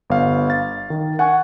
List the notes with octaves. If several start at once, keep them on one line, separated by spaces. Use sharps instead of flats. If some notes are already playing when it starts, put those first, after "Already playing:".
G1 F5
F5 A6
D#3
F#5 G#5 C#6 F#6